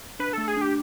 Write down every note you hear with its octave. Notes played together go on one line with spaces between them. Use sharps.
D4 B4
A3 A4
G#4
D4 G4